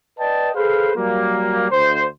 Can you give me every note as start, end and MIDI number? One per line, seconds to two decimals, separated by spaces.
0.19 0.51 71
0.19 0.51 74
0.19 0.51 75
0.19 0.51 79
0.19 0.51 81
0.55 0.93 68
0.55 0.93 69
0.55 0.93 71
0.55 0.93 72
0.55 0.93 77
0.96 1.67 54
0.96 1.67 55
0.96 1.67 58
1.71 2.06 38
1.71 2.06 72